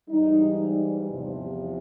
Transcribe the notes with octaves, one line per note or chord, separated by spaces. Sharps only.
G#2 E3 G3 D#4
E2 C3 F3